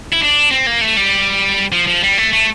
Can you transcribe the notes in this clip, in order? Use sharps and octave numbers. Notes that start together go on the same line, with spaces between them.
E4
D4
C4
A#3
A3
G3
F3
F3
G3
A3
A3